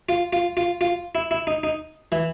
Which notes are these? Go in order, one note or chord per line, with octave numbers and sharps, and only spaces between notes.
F4
F4
F4
F4
E4
E4
D#4
D#4
E3